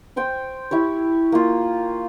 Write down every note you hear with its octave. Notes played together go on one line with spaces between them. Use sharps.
C5 G5 C6 C#6
E4 G4 C#5
A#3 F4